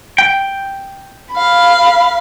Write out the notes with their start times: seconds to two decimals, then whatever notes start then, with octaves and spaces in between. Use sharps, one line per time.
0.18 G5
1.32 F5 B5